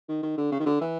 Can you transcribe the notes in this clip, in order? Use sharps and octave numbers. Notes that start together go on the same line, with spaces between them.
D#3
D#3
D3
C#3
D#3
D3
E3